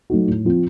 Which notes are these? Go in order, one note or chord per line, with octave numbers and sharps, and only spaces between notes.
F#3 A3 D#4 F#4
A2
F3 C4 F4